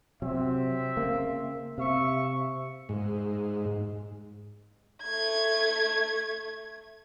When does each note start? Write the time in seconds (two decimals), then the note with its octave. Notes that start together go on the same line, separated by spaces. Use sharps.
0.22 C3 F#3 C4 E5
0.97 C#3 A#3
1.78 C3 E5 F5 C#6
2.89 G#2
5.03 A3 G#6